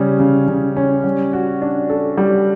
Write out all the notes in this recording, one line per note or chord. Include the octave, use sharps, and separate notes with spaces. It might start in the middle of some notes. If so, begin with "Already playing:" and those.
Already playing: C#3 G3 C#4
C#3
C#3
C#4
G3
F#4
D4
A4
G3